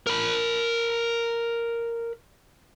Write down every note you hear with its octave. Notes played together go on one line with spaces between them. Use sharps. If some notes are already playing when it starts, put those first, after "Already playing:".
A#4 B5